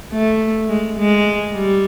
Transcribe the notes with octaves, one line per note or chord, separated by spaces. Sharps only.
A3
G#3
G#3
G3